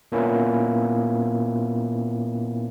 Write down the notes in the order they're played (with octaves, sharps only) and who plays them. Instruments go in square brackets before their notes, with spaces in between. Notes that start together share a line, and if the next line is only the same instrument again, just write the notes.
[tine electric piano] A#2 A#3 B3 C#4 E4